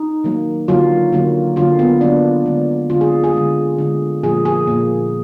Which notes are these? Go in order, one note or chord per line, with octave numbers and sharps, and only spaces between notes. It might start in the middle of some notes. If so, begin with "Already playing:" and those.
Already playing: D#4
D#3 F#3 A#3
D3 F#3 A#3 F4
D3 F#3 A#3
D3 F#3 A#3 F4
B3
D3 F#3 A#3 D4
D3 G#3
D3 G#3 F4
G#4
G#4
D3 G#3
D3 G#3
A#2 F3 A#3 G#4
G#4
A#2 F3 A#3